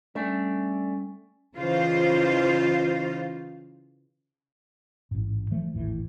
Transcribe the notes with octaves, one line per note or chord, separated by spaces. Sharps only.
G3 A3 C#4 D4 G#5
C#3 E3 D#4 F4 C5 F5
A1 G#2
E3 F3 A3
G#1 D#2 A2 E3